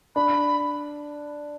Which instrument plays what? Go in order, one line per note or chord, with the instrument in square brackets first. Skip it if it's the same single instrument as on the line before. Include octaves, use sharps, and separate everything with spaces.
[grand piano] D4 [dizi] B5